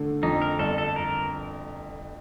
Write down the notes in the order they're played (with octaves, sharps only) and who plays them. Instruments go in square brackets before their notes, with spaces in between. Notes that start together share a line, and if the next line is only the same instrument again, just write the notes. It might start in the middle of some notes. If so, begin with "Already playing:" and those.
Already playing: [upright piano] D3 A3
[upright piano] F2 [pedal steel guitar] D#4
[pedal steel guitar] A#4
[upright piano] G1 [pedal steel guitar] A4
[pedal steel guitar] A4
A#4